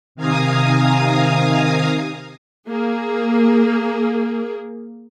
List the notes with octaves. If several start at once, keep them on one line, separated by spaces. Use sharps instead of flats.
C3 D#3 F5 G#5 A#5 D#6
A#3 G#4